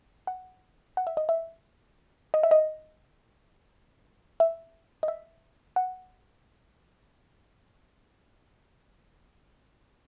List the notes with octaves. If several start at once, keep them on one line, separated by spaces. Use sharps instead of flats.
F#5
F#5
E5
D#5
E5
D#5
E5
D#5
E5
D#5
E5
F#5